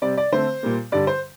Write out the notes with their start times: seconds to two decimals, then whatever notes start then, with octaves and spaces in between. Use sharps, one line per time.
0.02 C3 G3 C4 D5
0.17 D5
0.32 D3 A3 C4 C5
0.63 A#2 G3 A#3
0.92 G2 D3 G3 D5
1.07 C5